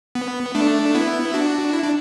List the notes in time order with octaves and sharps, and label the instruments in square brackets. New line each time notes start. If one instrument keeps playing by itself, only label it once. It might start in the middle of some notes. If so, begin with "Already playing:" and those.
[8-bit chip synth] B3
A3 D4
B3 E4
D4 F#4
E4
D4